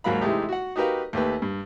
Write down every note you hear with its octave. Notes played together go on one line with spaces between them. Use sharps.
D#2 G#2 F#3 A#4 F5 B5
C3 E3 G#3 A3 D#4 G4
F#4 F#5
D#4 F#4 G4 A#4 B4 F5
D#2 A3 G4 B4
G2